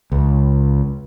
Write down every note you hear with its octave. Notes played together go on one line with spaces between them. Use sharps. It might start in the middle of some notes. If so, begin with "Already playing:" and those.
C#2